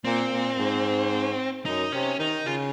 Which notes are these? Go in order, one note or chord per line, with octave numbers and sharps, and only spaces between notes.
A#2 C4
A#2
G#2
F#2 D#4
C3 C#4
D#3 D#4
C#3 F4